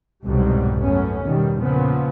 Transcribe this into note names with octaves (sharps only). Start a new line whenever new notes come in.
C2 F2 G#2 B2 F#3 G3
F#2 A3 B3 C#4
E2 B2 D#3 G3
A#2 C#3 F3 B3